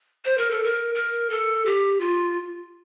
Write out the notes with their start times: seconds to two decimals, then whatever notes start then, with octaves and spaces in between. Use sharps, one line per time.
0.25 C5
0.38 A#4
0.51 A4
0.64 A#4
0.95 A#4
1.30 A4
1.65 G4
2.01 F4